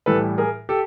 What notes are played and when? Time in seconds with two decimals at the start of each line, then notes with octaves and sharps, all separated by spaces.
0.06 A2 E3 G3 A4 B4
0.38 G#4 A#4
0.69 G4 A4